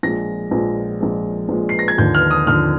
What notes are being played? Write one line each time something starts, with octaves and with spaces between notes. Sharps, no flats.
A#1 A#2 G#3 A#6
A#1 A#2 G#3
A#1 A#2 G#3
A#1 A#2 G#3
C7
A#6
G#6
D#2 D3 F3 G6
F6
D#6
D#2 D3 F3 F6